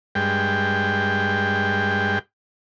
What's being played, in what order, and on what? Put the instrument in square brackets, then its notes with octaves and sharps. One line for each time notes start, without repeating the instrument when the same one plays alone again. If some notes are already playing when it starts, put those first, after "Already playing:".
[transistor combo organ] G2 G#3 G5